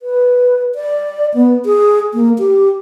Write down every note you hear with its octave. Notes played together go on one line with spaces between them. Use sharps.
B4
D5
B3
G#4
A#3
G4